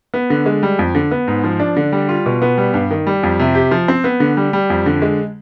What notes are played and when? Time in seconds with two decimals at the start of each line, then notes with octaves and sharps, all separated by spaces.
0.14 B3
0.30 D3
0.46 G#3
0.63 G3
0.79 F2
0.95 D3
1.11 B3
1.28 G#2
1.44 F3
1.60 D4
1.76 D3
1.92 G3
2.09 F4
2.26 B2
2.42 B3
2.58 G3
2.74 G2
2.91 D#3
3.07 G3
3.23 F2
3.39 C3
3.55 G4
3.71 F3
3.88 C4
4.04 B3
4.20 D3
4.37 G3
4.53 G3
4.70 F2
4.86 D3
5.02 G#3